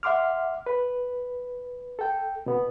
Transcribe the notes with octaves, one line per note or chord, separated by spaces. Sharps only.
E5 F#5 C6 D6 F6
B4
A4 G5
B2 B3